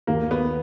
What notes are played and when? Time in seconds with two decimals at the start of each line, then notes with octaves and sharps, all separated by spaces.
0.07 D#2 A#3
0.31 B3